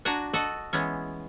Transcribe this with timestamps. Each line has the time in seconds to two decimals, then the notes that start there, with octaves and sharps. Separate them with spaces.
0.05 D4 F#4 G#5 A#5
0.33 F#4 A4 D#5
0.73 E3 G#3 B3 C#4